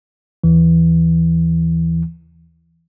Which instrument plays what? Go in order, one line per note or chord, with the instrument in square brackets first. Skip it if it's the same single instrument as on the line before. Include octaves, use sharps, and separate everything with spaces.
[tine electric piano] D#2 E3